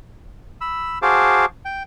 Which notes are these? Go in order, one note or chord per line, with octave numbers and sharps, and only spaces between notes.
B5 E6
F#4 G#4 C5 F5 A5 D6
G5